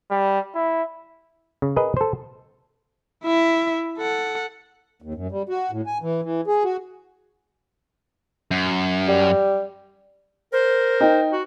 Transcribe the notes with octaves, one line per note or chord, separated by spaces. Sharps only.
G3
E4
C#3
G#4 A#4 B4 D#5
A4 C5
E4 E5
A4 F#5
D#2
F#2
G3
F#4
A2
G#5
E3
E3
G#4
F#4
F#2
G3
A#4 C5
D#4 G5
F#4